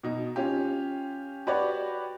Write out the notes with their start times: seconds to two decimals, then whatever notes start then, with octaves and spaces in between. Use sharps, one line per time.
0.03 B2 D#4
0.36 C#4 F4 G4
1.47 F#4 G4 B4 C#5 D5